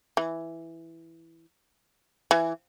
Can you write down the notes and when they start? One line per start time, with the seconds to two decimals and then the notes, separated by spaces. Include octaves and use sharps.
0.17 E3
2.31 E3